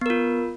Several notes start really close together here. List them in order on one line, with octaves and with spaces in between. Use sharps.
B3 A#4 F4